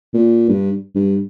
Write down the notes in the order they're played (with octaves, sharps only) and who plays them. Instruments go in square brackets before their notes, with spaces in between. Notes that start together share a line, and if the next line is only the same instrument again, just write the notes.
[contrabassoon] A#2
G2
G2